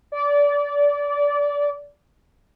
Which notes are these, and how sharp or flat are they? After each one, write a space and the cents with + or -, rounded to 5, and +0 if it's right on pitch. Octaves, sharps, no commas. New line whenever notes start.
D5 -25